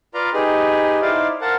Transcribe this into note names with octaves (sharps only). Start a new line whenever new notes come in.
F4 B4 D5 F5 A#5 C6
D#4 G4 G#4 B4
D#4 E4 C5 D5 F5
A#4 C5 F5 F#5 A5